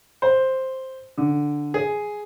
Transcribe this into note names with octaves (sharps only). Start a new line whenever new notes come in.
C5
D3
G#4